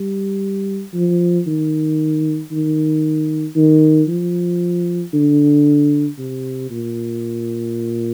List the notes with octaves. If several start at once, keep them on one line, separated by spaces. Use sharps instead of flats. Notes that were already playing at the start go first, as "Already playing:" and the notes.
Already playing: G3
F3
D#3
D#3
D#3
F3
D3
C3
A#2